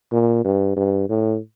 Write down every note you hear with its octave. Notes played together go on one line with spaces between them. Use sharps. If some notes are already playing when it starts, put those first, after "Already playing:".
A#2
G2
G2
A2